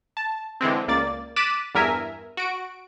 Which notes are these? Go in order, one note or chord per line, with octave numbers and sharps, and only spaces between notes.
A5
D3 E3 G#3 C4
C#2 A#3 D5 A6
D6 F#6 A6 B6 D#7 E7
E2 G2 A#4 E5 G#5
F#4 D7